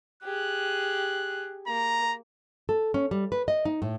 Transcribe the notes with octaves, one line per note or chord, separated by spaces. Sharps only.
G4 G#4 F#6
A#3 A#5
A4
C#4
G3
B4
D#5
D#4
A2